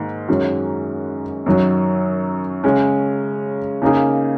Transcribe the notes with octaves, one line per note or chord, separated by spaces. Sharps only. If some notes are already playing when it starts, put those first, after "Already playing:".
Already playing: G#2 D#3 A#3
F#2 D#3 G#3 C#4 F#4
F#2 D#3 F#3
C#3 G#3 C#4
C#3 A#3 D#4 G#4